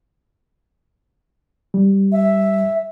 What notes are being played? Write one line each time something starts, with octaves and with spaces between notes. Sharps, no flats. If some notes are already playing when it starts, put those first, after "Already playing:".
G3
E5